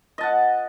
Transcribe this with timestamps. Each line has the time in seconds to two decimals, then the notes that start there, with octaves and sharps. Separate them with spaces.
0.18 D#5
0.21 A5
0.23 F#5